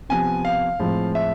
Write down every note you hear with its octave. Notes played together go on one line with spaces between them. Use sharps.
C3 F3 B3 G#5
F5
A2 F3 G#3 C4
E5